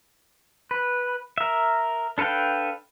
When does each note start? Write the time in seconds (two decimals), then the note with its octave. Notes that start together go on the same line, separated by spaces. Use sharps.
0.71 B4
1.38 A#4 E5
2.18 D4 A4 B4 F5 G5